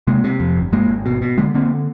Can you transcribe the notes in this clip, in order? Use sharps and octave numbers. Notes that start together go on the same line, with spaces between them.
C3 G#3 A#3
C3
F2
G1
G2 G#3 A#3
G#1
B2
B2
D3 G#3 A#3
D3 A#3 C4